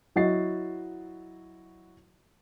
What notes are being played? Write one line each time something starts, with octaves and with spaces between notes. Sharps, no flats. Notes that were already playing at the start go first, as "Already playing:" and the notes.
F#3 E4 F#4 D#5 A6 C7